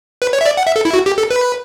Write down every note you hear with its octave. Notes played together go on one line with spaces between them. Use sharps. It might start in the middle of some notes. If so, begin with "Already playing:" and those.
B4
C#5
E5
D5
F#5
E5
A4
E4
F#4
G4
A4
B4